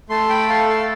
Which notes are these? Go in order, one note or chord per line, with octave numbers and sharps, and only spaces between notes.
A3 A5 C6
G5 B5
A4 F5 A5
F5 A5